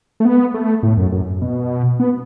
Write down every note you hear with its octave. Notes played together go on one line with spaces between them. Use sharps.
A3
B3
A3
A2
F#2
F#2
B2
B3